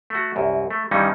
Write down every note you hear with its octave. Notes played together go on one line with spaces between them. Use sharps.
A3 F#4
C2 F#2
A3
G2 D#3 E3 G3 C#4 D#4